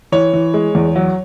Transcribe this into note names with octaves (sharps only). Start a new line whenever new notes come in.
E3 C#5
E3
G#3
E2
F#3